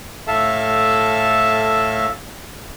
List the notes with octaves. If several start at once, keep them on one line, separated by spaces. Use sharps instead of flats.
A2 A4 E5 F5 A5